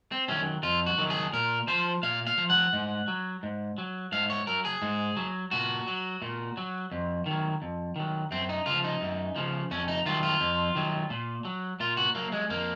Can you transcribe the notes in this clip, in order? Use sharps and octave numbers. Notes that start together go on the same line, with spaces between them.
C4
D#3 F#3 C#4
F2 F4
F#4
D#3 F#3
G#4
A#2 A#4
F3 C5
A#2 F5
F5
F3
F#5
G#2
F#3
G#2
F#3
G#2 F5
C#5
F#3 A#4
G#4
G#2
F#3
A#2 F#4
F#3
A#2
F#3
F2
D#3 F#3
F2
D#3 F#3
F#2 C4
D#4
C#3 F3 F4
D#4
F#2
C#3 F3
F2 C#4
D#4
D#3 F#3 F4
F4
F2
D#3 F#3
A#2
F#3
A#2 F4
F#4
F#3 A#3
G#3
F2 A#3